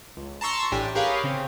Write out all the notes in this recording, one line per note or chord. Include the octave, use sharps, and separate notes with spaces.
C#2
A5 A#5 C6 C#6 E6
A1 A2 D4 G4 G#5
G4 G#4 A#4 B4 C#5 F5
C#3 C4